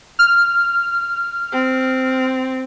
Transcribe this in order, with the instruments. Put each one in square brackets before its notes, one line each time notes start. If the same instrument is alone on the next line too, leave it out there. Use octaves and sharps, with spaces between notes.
[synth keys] F6
[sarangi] C4